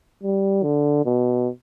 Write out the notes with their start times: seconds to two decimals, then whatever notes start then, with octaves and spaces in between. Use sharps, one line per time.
0.23 G3
0.64 D3
1.05 B2